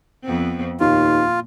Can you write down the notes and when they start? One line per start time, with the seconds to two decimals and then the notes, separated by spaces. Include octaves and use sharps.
0.23 F2 B3 C4
0.80 D#2 A#2 F4